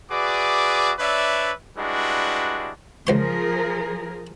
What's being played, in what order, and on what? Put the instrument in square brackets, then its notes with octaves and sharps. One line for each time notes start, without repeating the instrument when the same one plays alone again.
[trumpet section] F#4 G#4 B4 D5 E5 D6
D4 B4 C#5 D5 E5
G3 G#3 D4 E4 F#4 B4
[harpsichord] C#2 C5 C6 [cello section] F3 G#4 A#4